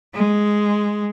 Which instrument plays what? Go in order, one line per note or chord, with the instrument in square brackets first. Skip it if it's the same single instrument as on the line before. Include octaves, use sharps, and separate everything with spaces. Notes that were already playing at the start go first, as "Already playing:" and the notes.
[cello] G#3